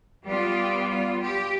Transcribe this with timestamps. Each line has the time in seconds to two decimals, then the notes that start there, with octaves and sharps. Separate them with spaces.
0.25 G3 B3 F4 G4
0.90 F4
1.21 G4